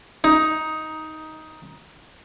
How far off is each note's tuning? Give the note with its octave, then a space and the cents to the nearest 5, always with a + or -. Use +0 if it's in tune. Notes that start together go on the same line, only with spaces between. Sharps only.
D#4 +10